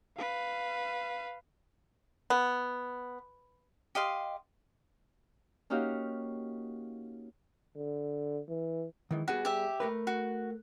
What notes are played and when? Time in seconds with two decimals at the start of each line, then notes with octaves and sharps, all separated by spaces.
0.17 B4 F5
2.30 B3
3.95 G4 D#5 F5 C6
5.70 A#3 C#4 D#4 F#4 G4 F5
7.76 D3
8.49 E3
9.11 D#3 E3 G#3
9.28 G3 B3 F#4 G#4
9.45 G4 E5
9.80 A3 A#4 B4
10.07 F#4